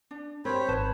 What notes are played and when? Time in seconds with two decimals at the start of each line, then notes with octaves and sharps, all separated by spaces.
0.11 D4
0.45 C4 G4 A#4 C5 C#5 B5
0.69 G#1 B4 A5